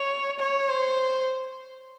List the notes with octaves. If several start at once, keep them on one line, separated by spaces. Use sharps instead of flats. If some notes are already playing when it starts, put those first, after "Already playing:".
Already playing: C#5
C#5
C5